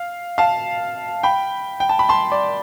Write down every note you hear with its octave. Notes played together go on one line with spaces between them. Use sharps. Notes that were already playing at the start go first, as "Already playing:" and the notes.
Already playing: F5
F5 A5
G5 B5
G5
A5
B5
A5 C6
D5